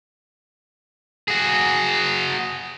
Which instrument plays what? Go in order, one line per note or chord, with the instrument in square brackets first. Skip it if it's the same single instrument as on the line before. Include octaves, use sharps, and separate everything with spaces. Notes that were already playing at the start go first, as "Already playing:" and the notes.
[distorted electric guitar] F#4 G#4